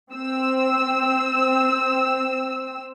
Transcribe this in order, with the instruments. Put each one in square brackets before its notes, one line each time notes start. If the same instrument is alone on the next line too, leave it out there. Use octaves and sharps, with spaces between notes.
[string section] C4 E6